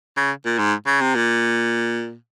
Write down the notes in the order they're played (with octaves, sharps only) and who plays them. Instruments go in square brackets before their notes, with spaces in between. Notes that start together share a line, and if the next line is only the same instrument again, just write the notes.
[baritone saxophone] C#3
A#2
G#2
C#3
C3
A#2